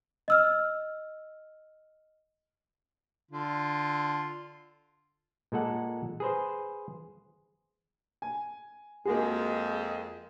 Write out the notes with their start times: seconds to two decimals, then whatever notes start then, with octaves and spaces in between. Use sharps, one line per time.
0.28 D#5 E6 F6
3.31 D3 F4
5.52 A#2 G#3 A4 F#5
6.20 G#4 B4 C5
8.22 G#5
9.05 F2 G#3 A#3 F#4 G#4